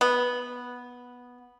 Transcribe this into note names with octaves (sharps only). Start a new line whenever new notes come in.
B3